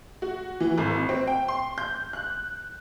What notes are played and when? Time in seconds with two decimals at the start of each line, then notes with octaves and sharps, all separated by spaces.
0.22 F#4
0.60 E3
0.78 G#1
1.09 C4
1.27 G5
1.48 C6
1.78 G6
2.13 F#6